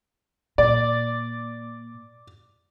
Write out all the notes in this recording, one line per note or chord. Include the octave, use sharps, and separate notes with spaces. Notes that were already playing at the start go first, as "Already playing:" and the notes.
A#2 D5